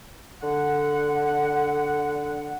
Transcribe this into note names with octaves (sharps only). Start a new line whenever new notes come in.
D3 F#5